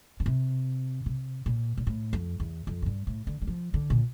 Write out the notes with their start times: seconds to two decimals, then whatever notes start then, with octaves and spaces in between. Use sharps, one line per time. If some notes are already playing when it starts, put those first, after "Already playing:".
0.20 D3
0.26 C3
1.06 C3
1.46 A#2
1.78 A#2
1.87 A2
2.13 F2
2.40 E2
2.67 F2
2.82 A2
2.86 G2
3.07 A2
3.27 D3
3.42 G3
3.47 F3
3.74 D3
3.90 A#2